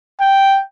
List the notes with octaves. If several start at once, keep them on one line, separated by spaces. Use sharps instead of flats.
G5